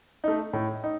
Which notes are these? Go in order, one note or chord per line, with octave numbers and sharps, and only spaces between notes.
A3 D#4
A2
D#4